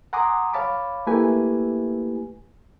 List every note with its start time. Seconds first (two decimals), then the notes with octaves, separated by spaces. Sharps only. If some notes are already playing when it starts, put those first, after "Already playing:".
0.13 F#5 G#5 A#5 C6 D6 D#6
0.53 C#5 F5 A5 B5 D6
1.07 A3 A#3 E4 G4 B4 G#5